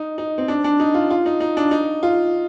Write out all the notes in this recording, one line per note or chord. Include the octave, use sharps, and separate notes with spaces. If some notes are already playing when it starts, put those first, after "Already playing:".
Already playing: D#4
D#4
C4
D4
D4
D#4
F4
F4
D#4
D#4
D4
D#4
F4